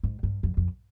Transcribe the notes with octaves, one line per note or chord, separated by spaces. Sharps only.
G#2
G2
F2
F2